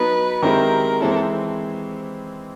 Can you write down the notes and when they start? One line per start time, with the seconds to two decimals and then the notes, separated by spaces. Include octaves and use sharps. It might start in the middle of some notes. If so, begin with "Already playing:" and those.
Already playing: F#3 B3 D#4 B4
0.43 D#3 G#3 C4 E4 G4 A#4
1.01 E3 G#3 C4 E4 A4
1.11 A#4
1.16 A4